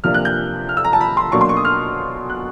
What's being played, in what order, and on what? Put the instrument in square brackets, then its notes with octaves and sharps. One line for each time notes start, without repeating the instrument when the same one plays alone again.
[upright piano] C3 F3 A#3 D4 F6
F#6
G6
F6
E6
A#5
A5
B5
C6
B2 F#3 A#3 D4 C#6
C6
C#6
D#6
F6
F#6